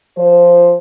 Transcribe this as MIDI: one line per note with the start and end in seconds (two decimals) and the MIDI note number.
0.18 0.75 53
0.18 0.75 72